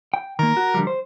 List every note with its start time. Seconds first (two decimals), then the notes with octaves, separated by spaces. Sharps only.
0.14 G5
0.39 D#3 A#3 A#4
0.57 F#4
0.74 D3 F3 G3
0.87 C5